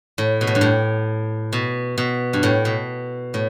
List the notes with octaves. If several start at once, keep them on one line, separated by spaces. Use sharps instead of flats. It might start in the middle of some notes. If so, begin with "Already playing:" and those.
A2
B2
A2
G2
A2
B2
B2
G2
A2
B2
A2